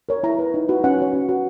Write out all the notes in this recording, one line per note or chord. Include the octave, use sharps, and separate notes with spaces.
A#4 C#5
E4 A#5
B4
D#4
F#4 B4
C#4 F#5
F#4 C#5
C#4
F#4 B4